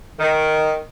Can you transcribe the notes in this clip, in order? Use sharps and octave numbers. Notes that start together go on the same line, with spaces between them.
D#3